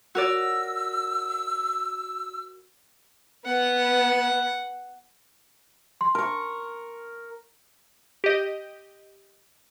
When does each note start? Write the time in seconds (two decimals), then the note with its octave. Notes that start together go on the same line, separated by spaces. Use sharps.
0.15 F#4 A#4 D5 E6
3.46 B3 F#5
6.01 C6
6.15 A#4 C#6
8.24 G4 D#5